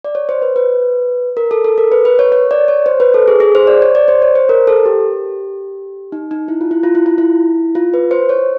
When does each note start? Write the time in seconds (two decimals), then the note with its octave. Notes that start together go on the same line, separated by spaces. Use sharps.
0.05 D5
0.15 C#5
0.29 C5
0.42 B4
0.56 B4
1.37 A#4
1.51 A4
1.64 A4
1.78 A#4
1.92 B4
2.05 B4
2.19 C#5
2.32 C#5
2.51 D5
2.68 C#5
2.86 C5
3.00 B4
3.14 A4
3.28 G#4
3.40 G#4
3.55 C5
3.67 D5
3.82 C#5
3.95 D5
4.08 C5
4.22 C#5
4.35 C5
4.49 A#4
4.67 A4
4.86 G4
6.12 D#4
6.31 D#4
6.48 E4
6.61 F4
6.71 E4
6.83 F4
6.95 E4
7.06 F4
7.18 E4
7.75 F4
7.94 B4
8.11 C5
8.29 C#5